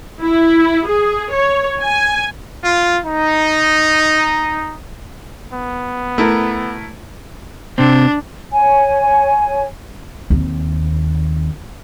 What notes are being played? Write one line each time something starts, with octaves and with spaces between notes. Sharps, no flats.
E4
G#4
C#5
G#5
F4
D#4
B3
A3 E4 A#4
C3 C4 D4
C#5 G#5
D#2 C4